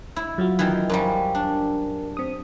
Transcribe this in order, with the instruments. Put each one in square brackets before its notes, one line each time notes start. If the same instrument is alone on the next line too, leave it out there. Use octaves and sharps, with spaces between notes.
[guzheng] E4
[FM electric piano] F#3 F4 F#4
[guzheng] D#3 E3
[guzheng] F#2 F3 G3 [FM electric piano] A#4
[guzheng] D4
[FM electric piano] C4 D#6